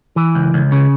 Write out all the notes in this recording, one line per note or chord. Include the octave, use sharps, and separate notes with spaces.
E3
C#2
C#2
C#3